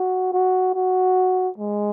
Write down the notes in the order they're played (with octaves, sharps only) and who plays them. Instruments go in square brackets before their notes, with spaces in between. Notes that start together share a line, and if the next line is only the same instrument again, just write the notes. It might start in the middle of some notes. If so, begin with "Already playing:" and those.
Already playing: [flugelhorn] F#4
F#4
F#4
G#3